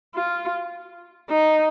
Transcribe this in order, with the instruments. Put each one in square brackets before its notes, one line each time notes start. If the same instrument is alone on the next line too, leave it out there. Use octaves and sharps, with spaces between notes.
[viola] F4
D#4